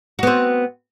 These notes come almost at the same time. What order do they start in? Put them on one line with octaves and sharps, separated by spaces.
F#4 B3 C4